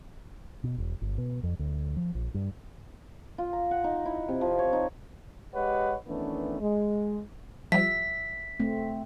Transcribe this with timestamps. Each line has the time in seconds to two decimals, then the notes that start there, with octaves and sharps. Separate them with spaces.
0.64 B2
0.78 E1
1.02 G1
1.18 B2
1.43 F2
1.59 D2
1.97 F3
2.15 A#1
2.34 G2
3.38 F4
3.53 A#5
3.71 F#5
3.84 D#4
4.06 E4
4.28 C3
4.41 F3
4.59 C#5
4.73 D#4
5.54 G#3 G4 B4 C#5 D#5 F#5
6.07 D#3 E3 A3 B3 C#4 D4
6.61 G#3
7.72 F3 G3 E5 B6
8.60 A3 C4